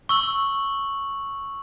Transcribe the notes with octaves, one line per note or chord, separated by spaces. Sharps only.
C#6 E6 F#7